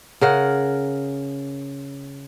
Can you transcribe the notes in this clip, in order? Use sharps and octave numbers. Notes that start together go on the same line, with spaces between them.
C#3 A#4 F#5